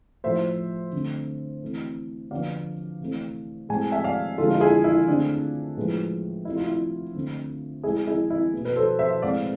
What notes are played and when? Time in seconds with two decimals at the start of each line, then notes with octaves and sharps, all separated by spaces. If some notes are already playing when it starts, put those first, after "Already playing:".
0.24 A2 F3 A3 C5 E5
0.92 D3 A3 C4
1.61 E3 A3 C4
2.31 D3 F3 B3 D5 F5
3.01 C3 E3 A3 C4
3.69 A2 G#3 C4 G#5
3.92 E5 G#5
4.04 D5 F5
4.38 D3 F3 G#3 F4 A4
4.51 F4
4.61 E4 G#4
4.84 E4
5.07 D3 A3 C4 D4
5.77 A2 F3 G#3 B3
6.45 C3 F3 A3 E4
6.56 F4
6.66 E4
7.14 D3 A3 C4
7.83 C3 G#3 C4 E4 G#4
8.07 E4 G#4
8.30 E4
8.53 B2 B3
8.65 B4
8.76 A4 C5
8.99 C5 E5
9.22 A2 G#3 C4 D5 F5